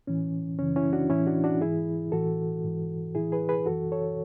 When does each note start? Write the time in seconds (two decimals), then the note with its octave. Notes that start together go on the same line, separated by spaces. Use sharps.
0.07 A2 E3 C#4
0.59 F#2 C#3 E3 C#4
0.76 C#4 E4
0.93 D4 F#4
1.10 A2 E3 C#4 E4
1.27 D4 F#4
1.44 D4 F#4
1.61 G#2 E3 E4 G#4
2.12 A2 E3 F#4 A4
2.64 G#2 E3
3.15 A2 E3 E4 G#4
3.32 G#4 B4
3.49 G#4 B4
3.66 F#2 E3 F#4 A4
3.92 A4 C#5